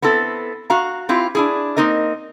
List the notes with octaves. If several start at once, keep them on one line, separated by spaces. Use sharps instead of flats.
B3 C4 E4 A4
F#4 F5 A#5
C4 E4 F4 G4
D4 E4 G#4
A#3 C4 D#4 A#4 D#5